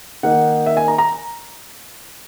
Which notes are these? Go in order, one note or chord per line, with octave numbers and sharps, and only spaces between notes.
D#3 A#3 D#4 F#5
E5
G#5
A#5
A#5